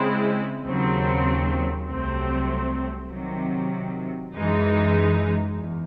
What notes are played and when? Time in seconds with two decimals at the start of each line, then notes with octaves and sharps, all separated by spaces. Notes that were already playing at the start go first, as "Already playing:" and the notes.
Already playing: C#3 G#3 C4 E4
0.66 D#2 C#3 F#3 C4
1.88 C2 C3 F#3 A3 C4
3.11 C3 D#3 F#3
4.33 F#2 E3 G#3 D#4
5.55 E2